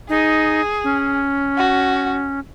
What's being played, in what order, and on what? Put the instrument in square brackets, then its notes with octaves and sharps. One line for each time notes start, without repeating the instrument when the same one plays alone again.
[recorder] D#4 [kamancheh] G#4
[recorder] C#4
[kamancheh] F#4